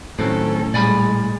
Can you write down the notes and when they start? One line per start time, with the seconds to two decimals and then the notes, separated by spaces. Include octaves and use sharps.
0.19 A2 D#3 F#3 C4 C#4 A4
0.74 A#2 G3 G#3 D5 G#5 B5